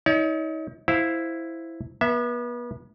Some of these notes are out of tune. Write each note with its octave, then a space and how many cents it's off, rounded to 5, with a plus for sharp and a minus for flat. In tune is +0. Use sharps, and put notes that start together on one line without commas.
D#4 +40 C#5 +45
E4 +0 C5 +0 F5 +5
B3 -35 E5 +0